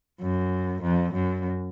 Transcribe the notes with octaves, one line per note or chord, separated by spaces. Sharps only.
F#2
F2
F#2